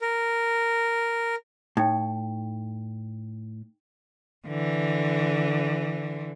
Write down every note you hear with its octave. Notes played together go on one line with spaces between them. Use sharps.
A#4
A2 D#4 G5
D3 E3